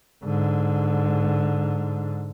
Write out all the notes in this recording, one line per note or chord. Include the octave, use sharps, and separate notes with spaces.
G#2 D3